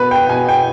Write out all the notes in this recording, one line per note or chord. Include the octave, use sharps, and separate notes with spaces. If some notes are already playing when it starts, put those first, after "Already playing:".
Already playing: B2 B3 B4
G5
B2 G#5
G5